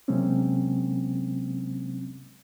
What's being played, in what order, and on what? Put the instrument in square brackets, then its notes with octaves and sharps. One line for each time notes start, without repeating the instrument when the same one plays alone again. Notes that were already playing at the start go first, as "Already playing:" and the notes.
[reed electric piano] C3 F#3 G#3 A#3 C4 C#4